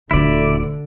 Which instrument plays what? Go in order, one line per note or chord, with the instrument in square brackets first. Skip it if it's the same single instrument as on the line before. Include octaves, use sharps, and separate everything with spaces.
[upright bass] D#1 F4 [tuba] D2 [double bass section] D3 [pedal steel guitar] E4 D5